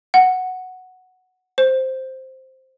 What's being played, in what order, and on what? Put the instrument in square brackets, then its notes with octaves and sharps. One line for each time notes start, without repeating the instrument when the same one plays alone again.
[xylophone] F#5
C5